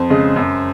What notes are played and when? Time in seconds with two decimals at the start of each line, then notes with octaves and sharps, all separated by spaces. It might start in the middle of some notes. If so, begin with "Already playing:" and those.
Already playing: F2 C5
0.10 C#3 G#3
0.36 F#2